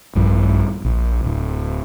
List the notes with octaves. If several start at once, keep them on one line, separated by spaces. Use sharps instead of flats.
A#1 G2 F3
A#1
D1